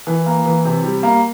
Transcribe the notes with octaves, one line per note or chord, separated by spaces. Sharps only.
E3
A#3
E3
C3
G3
A#3